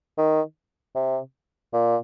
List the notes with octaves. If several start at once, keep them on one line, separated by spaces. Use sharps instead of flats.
D#3
C3
A#2